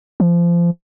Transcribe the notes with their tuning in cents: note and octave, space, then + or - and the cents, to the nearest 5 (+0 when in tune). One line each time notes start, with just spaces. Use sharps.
F3 -25